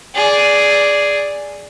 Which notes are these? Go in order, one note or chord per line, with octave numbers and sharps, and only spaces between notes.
G#4 D5